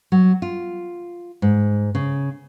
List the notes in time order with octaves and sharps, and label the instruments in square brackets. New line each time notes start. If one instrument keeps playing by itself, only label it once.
[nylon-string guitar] F#3
F4
G#2
C#3